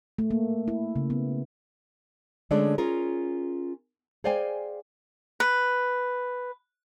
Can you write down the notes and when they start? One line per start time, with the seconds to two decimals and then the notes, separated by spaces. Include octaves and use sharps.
0.18 A3
0.31 A#3
0.68 E4
0.96 C#3
1.10 B3
2.51 D3 G#3 A3 C#4 D4 D5
2.78 C#4 F4 G#4 A#4
4.24 G#4 C5 D5 F5 G5 G#5
5.40 B4